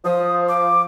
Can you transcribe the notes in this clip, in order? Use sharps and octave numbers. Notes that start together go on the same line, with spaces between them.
F3 D#6
D6